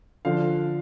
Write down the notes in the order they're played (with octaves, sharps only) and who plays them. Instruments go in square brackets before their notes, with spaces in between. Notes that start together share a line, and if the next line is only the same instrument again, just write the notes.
[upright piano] D3 F3 F5